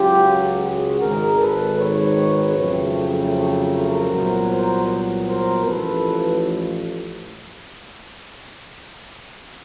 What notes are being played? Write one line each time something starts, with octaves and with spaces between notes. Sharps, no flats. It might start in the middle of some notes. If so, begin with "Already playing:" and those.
Already playing: C#2 C#3 F#3 F4 G4
F#4 G#4
G#1 G#2 D#3 G#4 A#4
A4 B4
B4 C#5
F2 C#3 F#3 A3 C4
A#4 C5
C2 A#2 F#3 B3
A#4 C5
A#4 C5
A1 A2 F3 A4 B4